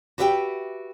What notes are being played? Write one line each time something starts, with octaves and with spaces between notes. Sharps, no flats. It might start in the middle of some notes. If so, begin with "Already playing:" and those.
F#4 G4 B4 E5 F5 G5